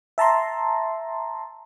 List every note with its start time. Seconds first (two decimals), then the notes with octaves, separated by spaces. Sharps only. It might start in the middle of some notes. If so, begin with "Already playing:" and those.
0.18 E5 A5 A#5 C6